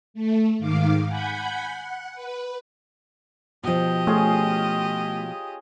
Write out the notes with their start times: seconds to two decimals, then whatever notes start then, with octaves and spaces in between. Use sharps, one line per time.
0.14 A3
0.59 G#2 D#3 F5 D6
1.07 F#5 G#5 B5 G6 G#6
1.73 F#5
2.14 B4
3.64 B2 F3 G4 D#5
4.07 A3 C#4 F4 G#4